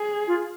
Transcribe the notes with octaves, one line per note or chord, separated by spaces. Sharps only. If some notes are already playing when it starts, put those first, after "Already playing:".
Already playing: G#4
F4